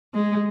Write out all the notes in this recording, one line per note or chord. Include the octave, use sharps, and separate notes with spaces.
G#3